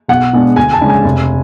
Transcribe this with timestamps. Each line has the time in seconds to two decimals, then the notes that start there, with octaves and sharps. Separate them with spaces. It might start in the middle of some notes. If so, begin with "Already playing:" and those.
0.08 B1 F#5
0.33 B2 G#3 B3 D4
0.56 D2 G#5
0.73 A5
0.81 C#3 G#3 D4
0.89 G#5
1.04 F1